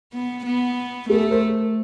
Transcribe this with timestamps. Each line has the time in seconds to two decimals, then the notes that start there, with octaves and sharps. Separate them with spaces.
0.13 B3
0.46 B3
1.09 A3 G#4 A#4
1.31 A#4 C5